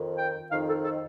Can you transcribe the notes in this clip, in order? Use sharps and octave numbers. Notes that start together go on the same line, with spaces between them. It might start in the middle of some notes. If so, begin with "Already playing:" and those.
Already playing: F2 D#3
G5
F2 D#3 F5
A4
A4